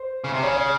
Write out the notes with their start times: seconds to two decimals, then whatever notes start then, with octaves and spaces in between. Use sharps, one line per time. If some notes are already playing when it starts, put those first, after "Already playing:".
Already playing: C5
0.24 C#3
0.33 C3
0.43 C#3 C#5
0.57 C#5